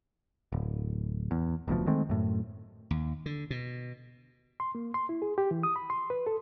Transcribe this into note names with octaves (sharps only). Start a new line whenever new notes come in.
D1
E2
F1 D2 B2 F3
D#3 G#3 A3 C4
F#2 A2
D#2
D3
B2
C6
A#3
C6
E4
G#4
G4
E3
D#6
B5
C6
B4
A4